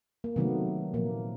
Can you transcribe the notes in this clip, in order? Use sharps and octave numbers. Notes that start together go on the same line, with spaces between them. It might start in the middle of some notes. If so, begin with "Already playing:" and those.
A#3
C3 D#3 F#3 A3 B3
A#2 F3 A#3